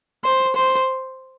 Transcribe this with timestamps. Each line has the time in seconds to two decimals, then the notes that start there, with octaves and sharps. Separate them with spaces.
0.25 C5
0.56 C5